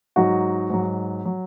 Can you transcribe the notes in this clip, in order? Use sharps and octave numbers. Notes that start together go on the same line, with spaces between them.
G#2 F#3 D#4 F#4
G#2 F#3
F#3